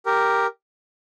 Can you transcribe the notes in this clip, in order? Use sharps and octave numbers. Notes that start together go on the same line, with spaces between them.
G4 A#4